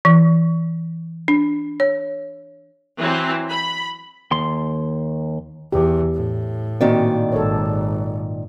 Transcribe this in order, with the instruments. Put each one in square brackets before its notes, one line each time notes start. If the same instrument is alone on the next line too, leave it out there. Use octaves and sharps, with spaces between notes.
[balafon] E3
D4
C#5
[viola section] E3 F#3 C4
B5
[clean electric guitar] D#2 C6
[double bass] E2 [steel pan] G4
[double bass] A2
[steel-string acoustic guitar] A#2 D#3 D5 [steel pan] C4 F#4
[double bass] G#1 [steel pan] A4 C#5